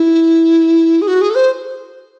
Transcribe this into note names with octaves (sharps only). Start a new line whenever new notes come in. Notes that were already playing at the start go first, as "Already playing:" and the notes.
Already playing: E4
G#4
F#4
G#4
A4
C5